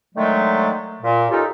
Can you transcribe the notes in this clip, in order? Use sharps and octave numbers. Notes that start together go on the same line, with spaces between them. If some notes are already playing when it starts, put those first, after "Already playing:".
D3 D#3 F#3 G#3 A3
A#2
C#4 D#4 F4 G4 A4 A#4